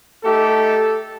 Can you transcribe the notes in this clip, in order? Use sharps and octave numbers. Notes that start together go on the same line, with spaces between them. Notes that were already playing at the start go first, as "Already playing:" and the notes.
A3 D#4 G4 A4